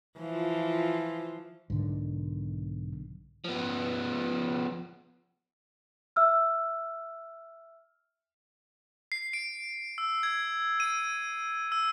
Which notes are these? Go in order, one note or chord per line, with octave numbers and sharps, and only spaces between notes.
E3 F3 F4
B1 G#2 D3 D#3
F3 B3
E5 E6 F6
C7
D7
E6
G#6
D#7
E6